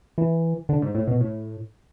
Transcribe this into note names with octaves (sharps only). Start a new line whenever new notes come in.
E3
D3
G#2
A2
B2
A2